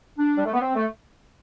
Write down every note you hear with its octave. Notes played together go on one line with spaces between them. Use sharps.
D4
G3
A3
B3
C4
A3